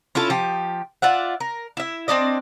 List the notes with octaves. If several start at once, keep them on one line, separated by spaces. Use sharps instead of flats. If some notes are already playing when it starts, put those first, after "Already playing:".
C#4 E4 F4 A4
F3 G4
F4 D5 E5 F#5
A#4
E4 E5
C4 D4 D5 D#5